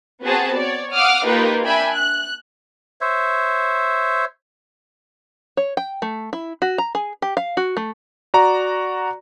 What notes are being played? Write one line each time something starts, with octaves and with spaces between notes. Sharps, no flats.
B3 C4 F#4 G#4 A5
C#5 D5
F5 F#5 D6 D#6 F6
A#3 D#4 F4 G4 B4
D4 E5 G5 G#5 B5
F#6
C5 C#5 E5
C#5
G5
A3
E4
F#4
A#5
G#4
G4
F5
F#4
A3
F#4 D5 A#5